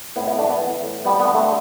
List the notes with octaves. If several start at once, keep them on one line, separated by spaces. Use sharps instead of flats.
A2 B3 E4
B3 E4
G3 A3 D4
B3
E3
A2
G3 B3
B3
D3
A3